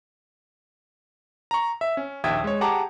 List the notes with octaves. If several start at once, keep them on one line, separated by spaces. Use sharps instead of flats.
A#5 C#6
E5
C#4
A#1 D#2 E5 G5 D#6 G#6
G#3 C#5
G4 G#4 F#5 A5 A#5 D6